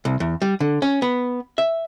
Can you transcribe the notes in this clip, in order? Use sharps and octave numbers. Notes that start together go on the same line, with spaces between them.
C2
E2
G3
D3
C#4
B3
E5